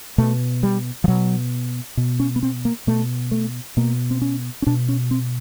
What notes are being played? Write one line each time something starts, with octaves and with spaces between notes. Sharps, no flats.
B2 A3
G3
F3
B2 F#3
B2
C#4
B3
C4
A#3
B2 A3
A3
B2 A#3
C4
C#4
C#4
B2 D4
C#4
C4